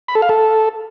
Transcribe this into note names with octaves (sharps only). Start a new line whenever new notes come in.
B5
A4
F5
A4